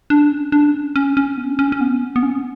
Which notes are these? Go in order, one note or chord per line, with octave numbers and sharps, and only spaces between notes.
D4
C#4
D4
C#4
C#4
C#4
B3
D4
C#4
C#4
B3
B3
C#4